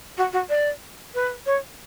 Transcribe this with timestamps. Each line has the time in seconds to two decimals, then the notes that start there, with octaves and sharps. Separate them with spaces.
0.18 F#4
0.33 F#4
0.50 D5
1.15 B4
1.46 C#5